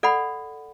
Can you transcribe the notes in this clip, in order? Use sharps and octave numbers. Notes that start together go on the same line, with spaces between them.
A4 D5 F#5 B5